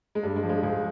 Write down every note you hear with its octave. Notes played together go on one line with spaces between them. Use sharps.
G#3
G2 G3
G#3
F3
G#3
C#2 G#3